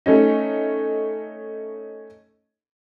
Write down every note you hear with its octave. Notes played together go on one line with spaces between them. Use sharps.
A3 C#4 D#4